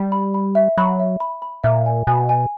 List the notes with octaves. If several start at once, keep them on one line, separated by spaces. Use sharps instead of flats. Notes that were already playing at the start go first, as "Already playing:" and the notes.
Already playing: G3
B5
B5
E5
F#3 B5
E5
B5
B5
A#2 E5
G#5
B2 G#5
G#5